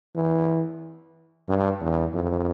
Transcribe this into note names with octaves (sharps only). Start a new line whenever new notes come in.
E3
G2
E2
F2